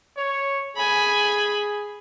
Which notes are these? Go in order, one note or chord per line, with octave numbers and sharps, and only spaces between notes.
C#5
G#4 G#5 B5